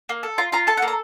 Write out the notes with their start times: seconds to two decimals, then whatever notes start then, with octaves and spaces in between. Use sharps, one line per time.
0.09 A#3
0.23 A4
0.38 F4 A#5
0.52 F4 A#5
0.67 A4 A5
0.77 F#5
0.82 A#3
0.88 A#5